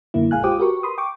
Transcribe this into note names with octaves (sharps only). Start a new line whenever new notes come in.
F#2 D3 A#3 E4
A#1 G#3 F5 G#5 F#6
F4 G4 C5 G5 D6 D#6
F#4 G4 A#4 B4 C#6
B5 C6 D#6
G5 C#6 D6